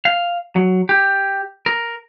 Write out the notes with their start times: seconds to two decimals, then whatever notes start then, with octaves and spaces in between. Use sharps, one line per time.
0.05 F5
0.56 F#3
0.89 G4
1.66 A#4